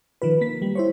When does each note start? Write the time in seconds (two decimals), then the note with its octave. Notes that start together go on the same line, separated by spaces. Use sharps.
0.22 D#3 F3 F4 B4
0.41 A#3 B6
0.62 G3
0.75 E4 C5 C#5